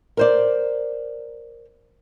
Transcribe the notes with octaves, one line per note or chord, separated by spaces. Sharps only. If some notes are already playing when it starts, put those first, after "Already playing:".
A#4 C5 D5